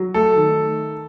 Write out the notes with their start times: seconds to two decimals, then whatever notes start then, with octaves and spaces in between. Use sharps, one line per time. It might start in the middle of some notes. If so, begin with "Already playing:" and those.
Already playing: F#3
0.14 A3 A4
0.36 D#3